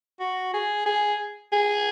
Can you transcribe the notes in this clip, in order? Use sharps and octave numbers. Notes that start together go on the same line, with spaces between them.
F#4
G#4
G#4
G#4